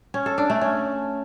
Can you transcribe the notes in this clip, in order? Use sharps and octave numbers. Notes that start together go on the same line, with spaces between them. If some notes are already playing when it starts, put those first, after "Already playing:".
C#4
A4
D4
A3
C#4